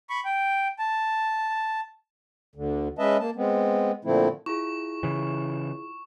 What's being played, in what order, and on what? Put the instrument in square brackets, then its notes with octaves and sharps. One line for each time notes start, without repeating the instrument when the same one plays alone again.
[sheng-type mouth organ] B5 C#6
G5
A5
[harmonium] D2 D3
G#3 C#4 B4 D#5 E5 A5
A#3 A5
G#3 B3 C4
A#2 D3 F3 A3 C4 E4
[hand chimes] E4 F4 G#4 [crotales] C#6
[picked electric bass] C#3 E3